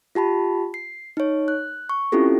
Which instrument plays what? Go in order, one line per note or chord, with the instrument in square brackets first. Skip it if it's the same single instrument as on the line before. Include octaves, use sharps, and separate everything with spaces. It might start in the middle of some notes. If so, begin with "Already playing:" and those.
[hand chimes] F4 G4 A5 B5
C7
D#4 C#5
F#6
C#6
C4 C#4 E4 F4 G4 A4